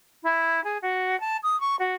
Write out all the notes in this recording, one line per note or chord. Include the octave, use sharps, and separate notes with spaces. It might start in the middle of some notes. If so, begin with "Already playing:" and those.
E4
G#4
F#4
A5
D#6
C#6
F#4